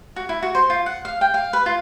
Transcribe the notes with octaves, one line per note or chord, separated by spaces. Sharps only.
F#4
E4
F#4
C5
F4
F#5
F5
G5
F5
B4
F4